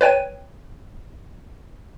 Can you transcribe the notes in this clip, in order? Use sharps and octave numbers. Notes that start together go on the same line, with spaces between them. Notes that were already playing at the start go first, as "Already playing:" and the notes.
B4 C#5 G5 D#7